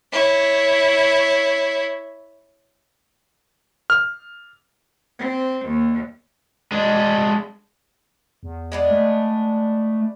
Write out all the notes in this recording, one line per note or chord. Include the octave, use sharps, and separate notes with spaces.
E4 C#5
F6
C4
D#2
G#3 D4
E2
G#3 B3 D4
A3